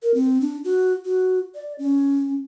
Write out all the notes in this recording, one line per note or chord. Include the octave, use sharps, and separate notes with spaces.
A#4
C4
D4
F#4
F#4
D5
C#4